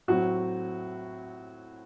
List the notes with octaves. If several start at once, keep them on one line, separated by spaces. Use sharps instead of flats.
A2 F#3 C4 F#4